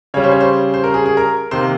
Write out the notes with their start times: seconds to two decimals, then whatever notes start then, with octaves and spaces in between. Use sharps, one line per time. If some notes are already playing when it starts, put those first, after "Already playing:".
0.14 C#3 G3 C#4 C#5
0.24 C5
0.32 C#5
0.40 C5
0.74 C5
0.84 A#4
0.94 G#4
1.06 G#4
1.17 A#4
1.51 C3 D#3 A#3 C5